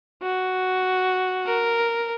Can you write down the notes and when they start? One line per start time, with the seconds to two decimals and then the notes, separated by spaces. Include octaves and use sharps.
0.22 F#4
1.46 A#4